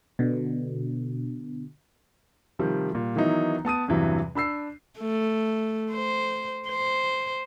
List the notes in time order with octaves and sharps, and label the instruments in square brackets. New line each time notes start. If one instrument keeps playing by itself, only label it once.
[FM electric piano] B2 D3
[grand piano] C3 D#3 F3 G3
A#2 G3
D#3 E3 F#3 B3 D#4 E4
B3 A5 D#6 D#7
E2 G2 C3 E3 F#3
D4 B5 E6 C7
[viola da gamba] A3
C5
C5